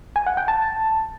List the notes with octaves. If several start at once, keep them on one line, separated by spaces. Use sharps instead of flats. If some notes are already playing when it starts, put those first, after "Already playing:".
G#5
F#5
G5
A5